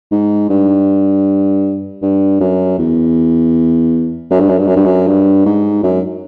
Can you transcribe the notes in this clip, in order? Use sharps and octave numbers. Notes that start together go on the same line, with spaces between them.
G#2
G2
G2
F#2
E2
F#2
G2
F#2
G2
F#2
G2
F#2
G2
G#2
F#2